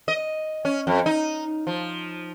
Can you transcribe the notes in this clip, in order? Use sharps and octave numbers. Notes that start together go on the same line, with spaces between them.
D#5
C#4
F2
D#4
F3